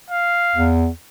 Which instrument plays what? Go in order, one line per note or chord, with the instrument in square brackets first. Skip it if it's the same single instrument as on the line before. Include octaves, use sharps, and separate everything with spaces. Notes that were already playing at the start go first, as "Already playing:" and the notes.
[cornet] F5
[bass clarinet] E2